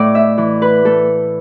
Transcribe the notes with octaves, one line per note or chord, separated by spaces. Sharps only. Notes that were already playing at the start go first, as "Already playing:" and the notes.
Already playing: A2 A3 D5
E5
E3
B4
A3 A4